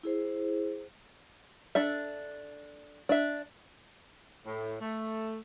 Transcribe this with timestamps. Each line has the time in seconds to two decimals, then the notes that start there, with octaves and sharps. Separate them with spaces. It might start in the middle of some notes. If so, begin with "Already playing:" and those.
0.03 E4 G#4 C5
1.75 D4 A4 E5
3.09 D4 E5
4.45 A2
4.81 A3